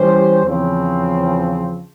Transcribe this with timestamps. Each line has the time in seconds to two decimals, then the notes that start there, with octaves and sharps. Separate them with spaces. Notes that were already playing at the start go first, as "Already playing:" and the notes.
Already playing: E3 G3 C#4 G4 C5
0.43 E2 C#3 F3 C4